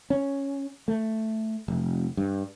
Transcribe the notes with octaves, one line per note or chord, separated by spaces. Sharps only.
C#4
A3
F1
G2